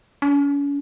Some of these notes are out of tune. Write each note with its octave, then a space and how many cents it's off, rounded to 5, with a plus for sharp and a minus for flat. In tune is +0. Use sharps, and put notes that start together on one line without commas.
C#4 +40